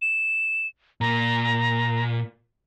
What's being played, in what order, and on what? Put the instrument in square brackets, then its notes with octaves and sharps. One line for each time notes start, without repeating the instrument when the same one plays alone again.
[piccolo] E7
[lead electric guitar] A#2 [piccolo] A#5